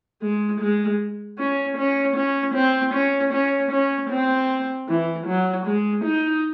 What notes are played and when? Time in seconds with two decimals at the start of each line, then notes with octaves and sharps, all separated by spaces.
0.22 G#3
0.61 G#3
1.38 C#4
1.77 C#4
2.16 C#4
2.55 C4
2.94 C#4
3.33 C#4
3.71 C#4
4.10 C4
4.89 E3
5.27 F#3
5.66 G#3
6.05 D#4